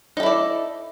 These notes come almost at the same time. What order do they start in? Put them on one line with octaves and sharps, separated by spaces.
D#4 A4 E4 D5